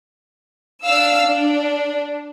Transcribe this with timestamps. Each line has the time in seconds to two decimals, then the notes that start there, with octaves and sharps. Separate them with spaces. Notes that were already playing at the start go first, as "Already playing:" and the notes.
0.85 D4 F5 E6
1.27 D4